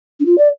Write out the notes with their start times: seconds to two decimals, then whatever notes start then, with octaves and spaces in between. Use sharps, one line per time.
0.19 D4
0.25 F4
0.37 D5